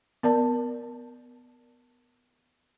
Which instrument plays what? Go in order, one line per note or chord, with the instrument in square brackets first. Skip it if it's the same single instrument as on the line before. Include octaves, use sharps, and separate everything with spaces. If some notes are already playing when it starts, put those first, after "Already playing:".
[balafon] B3 A#4 D5 A5